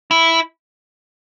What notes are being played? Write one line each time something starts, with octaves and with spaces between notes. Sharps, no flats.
E4